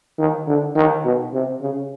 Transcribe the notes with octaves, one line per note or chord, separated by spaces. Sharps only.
D#3
D3
D#3
B2
C3
C#3